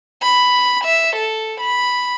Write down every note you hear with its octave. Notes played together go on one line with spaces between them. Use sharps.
B5
E5
A4
B5